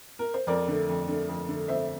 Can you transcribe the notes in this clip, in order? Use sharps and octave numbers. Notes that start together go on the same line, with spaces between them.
A#4
C5
F2 A#4 D5
D3 A3
F2
D3 A3
F2
D3 A3
F2 C5 E5